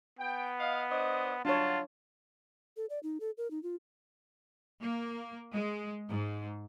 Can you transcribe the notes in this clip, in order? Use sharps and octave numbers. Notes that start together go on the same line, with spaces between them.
B3 G5
D#5 F5
D4 C5 D#5
F#3 D4 F4 C#5 A5
A4
D5
D#4
A4
A#4
D#4
F4
A#3
G#3
G#2